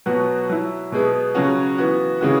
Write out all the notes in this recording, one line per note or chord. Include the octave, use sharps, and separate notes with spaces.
B2 F#3 B3 F#4
F#3 E4
B2 G#3 B3
C#3 F#3 C#4 F#4
E3 B3 F#4
C#3 E3 G#3 C#4 F#4